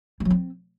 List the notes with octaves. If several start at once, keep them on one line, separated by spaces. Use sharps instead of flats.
G3
F#3
C4